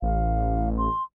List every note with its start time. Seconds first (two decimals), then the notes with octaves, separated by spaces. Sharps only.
0.02 A1 F5
0.78 C6